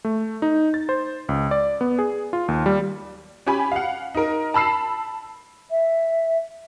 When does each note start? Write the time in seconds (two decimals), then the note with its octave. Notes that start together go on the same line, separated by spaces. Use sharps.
0.05 A3
0.42 D#4
0.74 A6
0.89 C5
1.29 C#2
1.51 D5
1.81 B3
1.99 G#4
2.33 F4
2.48 D#2
2.66 G3
3.47 C#4 G4 G#5 B5
3.72 F5 F#5
4.15 D#4 A#4
4.54 A5 B5 E6 C7 E7
5.71 E5